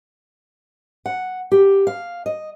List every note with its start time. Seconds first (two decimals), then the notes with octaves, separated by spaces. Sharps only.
1.06 F#5
1.52 G4
1.87 F5
2.26 D#5